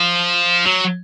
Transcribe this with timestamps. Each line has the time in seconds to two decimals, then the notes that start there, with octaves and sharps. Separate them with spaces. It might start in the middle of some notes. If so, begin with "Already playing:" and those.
Already playing: F3
0.66 F#3